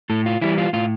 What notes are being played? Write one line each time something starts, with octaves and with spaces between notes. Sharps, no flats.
A2 A4
F4
E3 G3 E4
F4
A2 F4